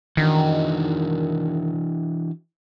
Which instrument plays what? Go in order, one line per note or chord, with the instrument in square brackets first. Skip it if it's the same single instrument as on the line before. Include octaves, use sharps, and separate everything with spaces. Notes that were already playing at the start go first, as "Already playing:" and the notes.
[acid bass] D#3 [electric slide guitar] E3 D4 F#4